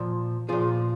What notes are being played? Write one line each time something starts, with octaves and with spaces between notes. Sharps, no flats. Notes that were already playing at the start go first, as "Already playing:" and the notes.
Already playing: A#2 F3
A#2 F3 F4 G#4